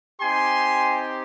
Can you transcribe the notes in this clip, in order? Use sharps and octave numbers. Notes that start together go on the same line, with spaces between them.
C4 D#4 G4 G#5 C6